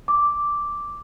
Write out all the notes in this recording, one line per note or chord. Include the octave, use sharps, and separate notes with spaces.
D6